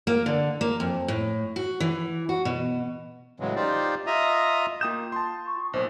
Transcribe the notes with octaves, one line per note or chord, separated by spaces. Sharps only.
A#3
D3
A#3
F2
A2
F#4
E3
F#4
B2
A2 C#3 E3 F#3 G#3
D#4 F4 G4 C5 D5
F4 D#5 E5 A#5 D#6
A#3 F4 G5 D#6 G6 E7
A5 C6
C#6
B1 A#2 C5